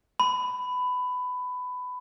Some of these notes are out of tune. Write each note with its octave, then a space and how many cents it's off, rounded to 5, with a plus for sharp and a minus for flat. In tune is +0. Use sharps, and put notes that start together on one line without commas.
B5 +15